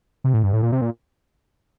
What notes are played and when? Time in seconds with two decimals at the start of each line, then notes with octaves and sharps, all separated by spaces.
0.24 C3
0.34 A2
0.43 G2
0.53 A2
0.63 A#2
0.72 C3
0.82 A#2